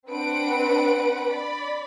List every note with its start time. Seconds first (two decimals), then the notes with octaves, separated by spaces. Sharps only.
0.10 C4 D4 B4 F#5 D7
1.28 D5 B5